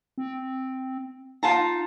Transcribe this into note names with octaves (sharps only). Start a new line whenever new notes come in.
C4
D#4 F4 A5 A#5